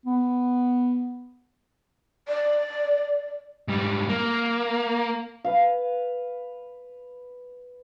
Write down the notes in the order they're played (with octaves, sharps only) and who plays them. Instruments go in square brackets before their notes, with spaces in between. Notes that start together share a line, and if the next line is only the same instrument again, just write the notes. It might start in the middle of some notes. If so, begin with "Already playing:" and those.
[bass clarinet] B3
[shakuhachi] D5
[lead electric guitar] G#2 G3
A#3
[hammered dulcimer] B4 F5